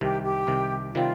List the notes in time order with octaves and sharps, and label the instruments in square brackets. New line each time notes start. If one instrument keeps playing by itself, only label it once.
[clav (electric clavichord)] C2 C3 D#3 [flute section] G4
[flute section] G4
[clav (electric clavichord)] C2 C3 D#3
[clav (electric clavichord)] C3 D#3 G3 C4 [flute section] F4